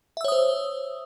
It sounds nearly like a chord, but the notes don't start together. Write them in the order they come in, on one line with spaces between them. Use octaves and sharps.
E5 E6 C#5 D#6 C5